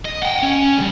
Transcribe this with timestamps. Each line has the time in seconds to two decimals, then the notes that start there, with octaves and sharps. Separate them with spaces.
0.05 D#5
0.23 F#5 G5
0.43 C#4
0.78 B1 G2